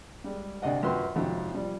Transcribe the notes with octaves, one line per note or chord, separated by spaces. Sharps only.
G3 G#3
D2 C3 D5 D#5 F#5
F#2 F3 F#4 B4 G5 C6
F2 G#2 C3 F#3
F3 G3